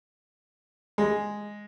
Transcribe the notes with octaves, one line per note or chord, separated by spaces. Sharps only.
G#3